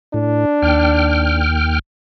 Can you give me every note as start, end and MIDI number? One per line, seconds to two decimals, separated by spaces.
0.14 0.45 45
0.14 1.44 62
0.62 1.79 39
0.62 1.79 79
0.62 1.79 89